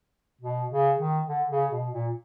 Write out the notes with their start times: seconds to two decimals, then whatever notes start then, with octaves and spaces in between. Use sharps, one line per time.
0.41 B2
0.70 C#3
0.98 D#3
1.27 D3
1.50 C#3
1.71 B2
1.92 A#2